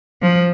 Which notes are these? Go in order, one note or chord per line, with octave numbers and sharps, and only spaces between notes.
F3